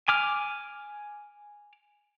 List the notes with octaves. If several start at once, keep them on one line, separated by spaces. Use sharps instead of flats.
G#5 D6 F6